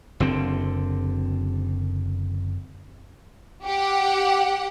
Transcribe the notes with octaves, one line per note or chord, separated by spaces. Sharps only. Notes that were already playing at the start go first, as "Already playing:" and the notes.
F#1 D3 C4
G4 F#5